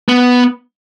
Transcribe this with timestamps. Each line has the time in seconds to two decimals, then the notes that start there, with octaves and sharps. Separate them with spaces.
0.08 B3